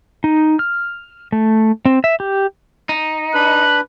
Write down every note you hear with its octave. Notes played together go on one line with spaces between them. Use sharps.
D#4
F6
A3
C4
E5
G4
D#4
D4 B4 B5 F#6